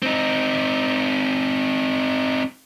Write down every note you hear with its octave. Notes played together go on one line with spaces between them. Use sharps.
C4 D#4